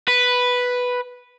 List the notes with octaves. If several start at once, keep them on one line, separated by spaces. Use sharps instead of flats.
B4